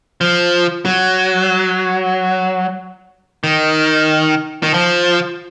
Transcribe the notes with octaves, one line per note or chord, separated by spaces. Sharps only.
F3
F#3
D#3
D#3
F3